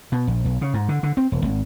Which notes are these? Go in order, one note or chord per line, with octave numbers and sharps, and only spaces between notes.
B2
A#1
B1
C#3
G#2
D3
D3
C4
E1
G#1